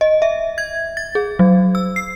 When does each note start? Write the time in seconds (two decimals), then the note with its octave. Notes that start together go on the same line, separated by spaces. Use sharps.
0.01 D#5
0.22 E5
0.58 G#6
0.97 A6
1.15 G#4
1.39 F#3
1.75 E6
1.96 C7